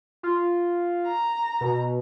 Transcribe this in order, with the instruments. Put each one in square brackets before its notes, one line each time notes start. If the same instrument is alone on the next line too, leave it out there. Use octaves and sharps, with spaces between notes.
[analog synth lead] F4
[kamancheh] A#5
[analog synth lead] B2